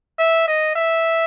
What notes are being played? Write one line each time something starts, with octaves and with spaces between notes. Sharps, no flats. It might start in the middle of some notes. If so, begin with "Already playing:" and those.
E5
D#5
E5